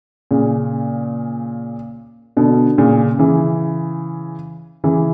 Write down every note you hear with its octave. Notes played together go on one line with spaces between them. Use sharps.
A#2 C#3
B2 D3
A#2 C#3
C#3 E3
C#3 E3